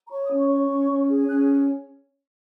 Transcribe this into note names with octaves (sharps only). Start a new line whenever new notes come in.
A#5
C#5 C#6
D#6
C#4
C#6
C#5
C#4
C#4
G#4
C#4 F#6